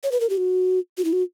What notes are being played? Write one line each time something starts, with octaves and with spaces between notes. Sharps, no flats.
C#5
B4
A#4
G4
F#4
F#4
E4
F#4